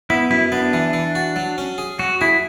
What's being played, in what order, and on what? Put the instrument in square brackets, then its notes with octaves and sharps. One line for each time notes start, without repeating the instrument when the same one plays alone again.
[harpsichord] B3 [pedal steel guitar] E4
[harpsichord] F#2 [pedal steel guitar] E4
[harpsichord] B3 [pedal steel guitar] D4
[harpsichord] E3
E3
F#4
F#3
C#4
G#4
[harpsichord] F#3 [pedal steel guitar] F#4
[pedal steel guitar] E4 [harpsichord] G#4